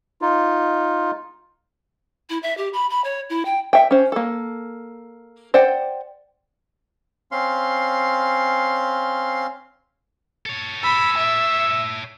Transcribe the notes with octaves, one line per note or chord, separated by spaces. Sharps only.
D#4 F4
E4
E5
G4
B5
B5
C#5
E4
G5
E5 G5
C#4 C5
A#3 A4
C5 D5 F#5 G5
C4 C#4 F5 C6
A4 C#5
B5 E6
E5